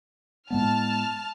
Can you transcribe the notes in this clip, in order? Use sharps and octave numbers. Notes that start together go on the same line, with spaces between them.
A2 G#3 B3 A5 F6